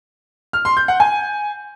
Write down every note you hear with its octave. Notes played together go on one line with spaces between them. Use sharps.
F6
C6
G6
F#5
G#5